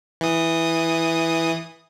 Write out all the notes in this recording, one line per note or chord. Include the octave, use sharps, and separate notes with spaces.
E3 D#6